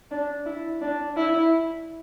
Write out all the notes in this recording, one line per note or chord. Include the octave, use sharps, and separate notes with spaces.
D4
E4
D4
E4